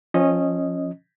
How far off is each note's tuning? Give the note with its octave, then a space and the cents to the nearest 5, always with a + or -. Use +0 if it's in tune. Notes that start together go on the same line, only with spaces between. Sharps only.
F3 +0 C#4 -20 D#5 +0